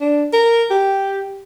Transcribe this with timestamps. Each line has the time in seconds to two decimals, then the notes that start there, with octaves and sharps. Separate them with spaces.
0.01 D4
0.33 A#4
0.70 G4